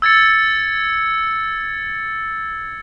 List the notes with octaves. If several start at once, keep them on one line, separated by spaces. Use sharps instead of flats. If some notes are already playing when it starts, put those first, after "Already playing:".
E6 G#6 A6 C#7